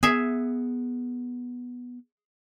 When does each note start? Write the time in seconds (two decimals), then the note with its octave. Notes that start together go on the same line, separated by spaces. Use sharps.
0.03 B3 G#4 E5